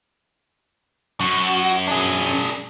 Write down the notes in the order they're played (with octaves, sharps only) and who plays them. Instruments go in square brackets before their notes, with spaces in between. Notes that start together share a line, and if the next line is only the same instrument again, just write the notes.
[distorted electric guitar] F#2 [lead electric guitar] F#4
[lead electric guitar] D4 G#4